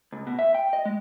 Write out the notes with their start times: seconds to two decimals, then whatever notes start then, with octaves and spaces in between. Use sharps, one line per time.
0.13 C#2
0.27 B2
0.39 E5
0.55 G5
0.73 D#5
0.85 G#3